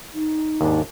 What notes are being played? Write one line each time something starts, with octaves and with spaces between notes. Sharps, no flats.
D#4
D#2 G#2 D4